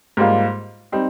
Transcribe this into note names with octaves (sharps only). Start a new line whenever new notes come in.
G#2 G3 A#3 F4
G3 C4 D#4